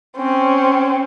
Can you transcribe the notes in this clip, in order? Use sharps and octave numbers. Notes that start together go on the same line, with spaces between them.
C4 C#4